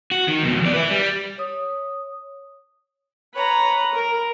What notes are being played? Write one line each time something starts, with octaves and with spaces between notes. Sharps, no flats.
F#4
D#3
F2 B2
D#2 D5
B4 E5
G3
C#5 D#6
B4 C#5 A#5
A#4